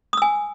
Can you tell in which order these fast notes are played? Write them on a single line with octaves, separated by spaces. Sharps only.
D#6 E6 G#5